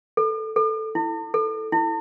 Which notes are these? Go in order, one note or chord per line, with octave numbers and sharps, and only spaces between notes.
A4
A4
E4
A4
E4